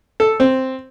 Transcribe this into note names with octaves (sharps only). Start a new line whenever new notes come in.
A4
C4